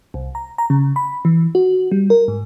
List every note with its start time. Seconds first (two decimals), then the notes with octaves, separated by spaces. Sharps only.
0.14 C2
0.35 A#5
0.58 A#5
0.70 C#3
0.96 B5
1.25 E3
1.55 F#4
1.92 G3
2.10 A#4
2.28 G#2